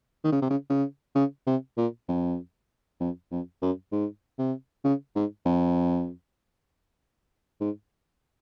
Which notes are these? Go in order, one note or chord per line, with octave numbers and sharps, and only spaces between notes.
D#3
C#3
C3
C#3
C#3
C#3
C3
A#2
F2
F2
F2
F#2
G#2
C3
C#3
G#2
F2
G#2